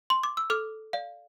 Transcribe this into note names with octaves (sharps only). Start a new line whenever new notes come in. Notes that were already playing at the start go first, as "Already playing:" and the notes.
C6
D6
E6
A4 D6 F6
D5 F5